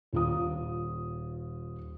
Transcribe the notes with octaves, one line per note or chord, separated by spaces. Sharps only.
D#1 F4 D#6